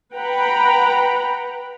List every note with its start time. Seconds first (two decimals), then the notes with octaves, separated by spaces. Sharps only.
0.14 B4 F#5 G5 A#5 B5